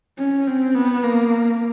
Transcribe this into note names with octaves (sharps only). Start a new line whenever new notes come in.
C#4
C4
B3
A#3